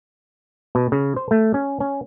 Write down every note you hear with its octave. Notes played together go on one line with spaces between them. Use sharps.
B2
C#3
C5
A3
C#4
C#4